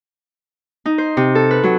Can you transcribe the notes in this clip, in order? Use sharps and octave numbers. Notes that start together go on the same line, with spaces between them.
D#4
C5
C3
A4
B4
F#3